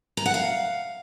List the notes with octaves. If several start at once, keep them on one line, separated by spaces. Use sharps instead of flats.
A#5
F#5
F5